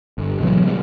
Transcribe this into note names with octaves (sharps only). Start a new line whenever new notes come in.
G1
B2 E3 F#3 B3
C#3 G3 B3